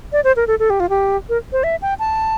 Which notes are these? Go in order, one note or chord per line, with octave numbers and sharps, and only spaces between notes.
D5
C5
A#4
A4
A4
G4
F4
G4
A#4
C5
E5
G5
A5